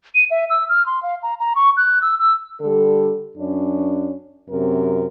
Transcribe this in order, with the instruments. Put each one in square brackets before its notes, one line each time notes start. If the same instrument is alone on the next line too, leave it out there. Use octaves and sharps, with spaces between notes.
[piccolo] D#7
E5
E6
F6
C6
F5
A#5
A#5
C#6
F#6
E6
E6
[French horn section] D3 G3 A4
F#2 C#4 D4
F#2 C3 C4 A#4